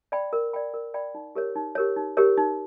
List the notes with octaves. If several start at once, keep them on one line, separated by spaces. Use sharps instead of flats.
D5 G5 B5
A#4
D5 G5 B5
A#4
D5 G5 B5
D#4
G4 A#4 C#5
D#4
G4 A#4 C#5
D#4
G4 A#4 C#5
D#4